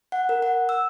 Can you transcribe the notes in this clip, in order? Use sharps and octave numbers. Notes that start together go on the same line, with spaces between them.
F#5
A#4
F#5
E6